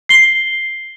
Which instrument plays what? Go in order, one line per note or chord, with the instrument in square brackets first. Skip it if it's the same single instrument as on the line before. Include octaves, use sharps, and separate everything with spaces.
[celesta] C7 G7